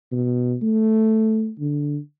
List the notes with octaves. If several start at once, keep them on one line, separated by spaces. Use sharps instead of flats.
B2
A3
D3